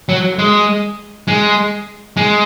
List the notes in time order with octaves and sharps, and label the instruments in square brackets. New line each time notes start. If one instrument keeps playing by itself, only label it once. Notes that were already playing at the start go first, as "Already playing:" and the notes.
[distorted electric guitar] F#3
G#3
G#3
G#3